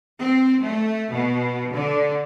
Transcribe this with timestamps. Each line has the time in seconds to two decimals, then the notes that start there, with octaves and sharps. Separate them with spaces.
0.20 C4
0.63 A3
1.11 B2
1.74 D3